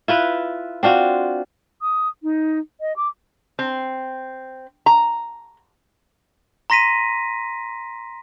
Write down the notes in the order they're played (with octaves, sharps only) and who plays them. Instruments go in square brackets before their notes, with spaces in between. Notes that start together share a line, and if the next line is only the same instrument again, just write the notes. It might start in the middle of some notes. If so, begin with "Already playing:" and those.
[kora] E4 F4 B4
C4 D4 F4 F#4
[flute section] D#6
D#4
D#5
D6
[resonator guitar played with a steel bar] C4
A#5
[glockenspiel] A#5 C6 A#6 B6 D#7